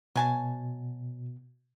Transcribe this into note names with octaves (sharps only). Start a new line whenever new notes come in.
B2 F#3 G#5 A5